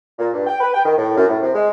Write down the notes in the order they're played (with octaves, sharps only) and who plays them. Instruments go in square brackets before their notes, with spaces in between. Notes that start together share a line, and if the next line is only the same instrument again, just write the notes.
[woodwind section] A#2
G2
G5
B4
G5
D#3
A2
F#2
A2
C3
G#3